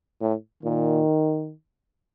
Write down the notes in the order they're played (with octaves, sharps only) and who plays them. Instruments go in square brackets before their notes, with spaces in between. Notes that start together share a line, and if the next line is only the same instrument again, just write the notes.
[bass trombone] A2
[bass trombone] A#2 [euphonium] D#3